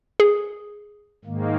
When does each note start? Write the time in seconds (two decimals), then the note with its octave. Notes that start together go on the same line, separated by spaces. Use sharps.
0.20 G#4
1.25 G#2 D#3 A#3